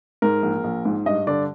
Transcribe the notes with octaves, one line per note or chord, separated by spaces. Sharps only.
G#2 A#4
A#1
A#1
G#2
G2 D#5
D3 D5